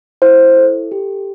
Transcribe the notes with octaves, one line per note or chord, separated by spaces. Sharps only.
E4 C5
A4
G4